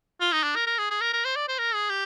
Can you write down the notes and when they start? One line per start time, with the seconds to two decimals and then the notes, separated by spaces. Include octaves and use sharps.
0.20 F4
0.32 D#4
0.44 D4
0.56 A#4
0.67 A#4
0.78 G#4
0.91 G#4
1.01 A#4
1.13 A#4
1.25 C5
1.36 D5
1.49 C5
1.59 A#4
1.74 G#4
1.90 G4